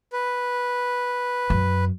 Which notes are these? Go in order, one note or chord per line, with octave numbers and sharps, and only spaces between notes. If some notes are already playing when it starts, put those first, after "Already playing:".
B4
F#2